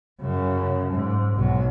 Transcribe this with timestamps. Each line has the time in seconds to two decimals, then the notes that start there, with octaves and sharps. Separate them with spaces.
0.21 F#2 C#3
0.92 G#2
1.37 B1 F#3